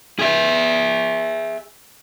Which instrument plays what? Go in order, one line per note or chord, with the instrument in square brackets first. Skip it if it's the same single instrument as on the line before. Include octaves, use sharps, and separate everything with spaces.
[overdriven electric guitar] G#4 E5